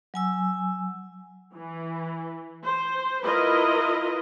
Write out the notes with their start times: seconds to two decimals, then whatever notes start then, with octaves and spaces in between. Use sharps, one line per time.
0.14 F#3 G#5 E6
1.55 E3
2.63 C5
3.24 E4 F4 A#4 B4 D#5